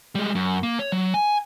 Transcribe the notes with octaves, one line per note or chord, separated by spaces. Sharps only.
G3 G#3
F#2
A#3
C#5
F#3
G#5